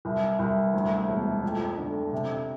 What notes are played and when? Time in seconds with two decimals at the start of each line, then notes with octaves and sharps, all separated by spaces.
0.05 C2
0.39 C2
0.74 D2
1.08 E1
1.43 F2
1.77 D3
2.13 C3